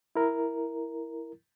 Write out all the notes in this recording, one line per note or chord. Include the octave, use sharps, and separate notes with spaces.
E4 A#4